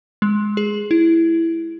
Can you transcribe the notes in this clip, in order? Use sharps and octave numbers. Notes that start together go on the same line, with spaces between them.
G#3
G#4
E4